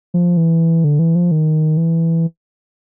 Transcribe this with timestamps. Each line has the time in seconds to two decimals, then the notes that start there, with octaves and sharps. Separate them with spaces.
0.14 F3
0.37 E3
0.84 D3
0.99 E3
1.15 F3
1.31 D#3
1.77 E3